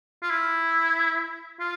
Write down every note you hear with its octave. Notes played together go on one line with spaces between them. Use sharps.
F4
E4
F4